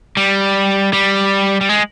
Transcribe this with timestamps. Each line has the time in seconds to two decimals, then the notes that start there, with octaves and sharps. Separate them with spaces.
0.17 G3
0.93 G3
1.61 G3
1.69 G#3